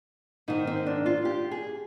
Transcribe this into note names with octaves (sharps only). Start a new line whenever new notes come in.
G#2 D#3 G#3 D#4
C4
D4
F4
G4
G#4